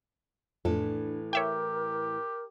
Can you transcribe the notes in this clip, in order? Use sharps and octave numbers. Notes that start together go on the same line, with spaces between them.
F2 A2 E3 D4 A4
G4 A#4 C#5 E5 G5